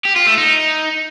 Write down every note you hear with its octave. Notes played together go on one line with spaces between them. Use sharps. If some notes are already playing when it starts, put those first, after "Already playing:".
G4
F4
A3
D#4